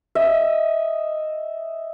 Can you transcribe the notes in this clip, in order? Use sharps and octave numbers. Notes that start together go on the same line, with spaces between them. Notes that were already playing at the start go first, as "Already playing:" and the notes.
D#5 E5